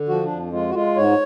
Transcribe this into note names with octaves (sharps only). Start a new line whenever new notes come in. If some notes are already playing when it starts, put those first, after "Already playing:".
Already playing: D3
F3 F#4
D4
F2
G#3 F4
F#4
G#3 F4
G#2 C#5